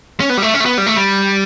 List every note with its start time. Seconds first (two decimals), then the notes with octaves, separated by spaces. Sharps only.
0.20 C#4
0.30 B3
0.37 G3
0.42 A3
0.54 C#4
0.60 A3
0.66 B3
0.78 G3
0.86 A3
0.96 G3